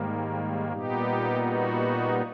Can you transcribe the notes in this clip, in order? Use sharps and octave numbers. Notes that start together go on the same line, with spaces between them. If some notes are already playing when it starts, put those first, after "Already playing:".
Already playing: G#2 D#3 G3 A#3
A#2 G3 B3 D#4 G4
F#4